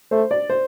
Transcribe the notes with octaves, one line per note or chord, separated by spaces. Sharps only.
A3 C5
D5
C5